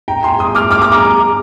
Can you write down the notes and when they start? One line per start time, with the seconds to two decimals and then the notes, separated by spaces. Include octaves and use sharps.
0.08 G5 A#5
0.23 G#5 C6
0.39 C6 D#6
0.55 D6 F6
0.71 D6 F6
0.82 D6 F6
0.92 A#5 D6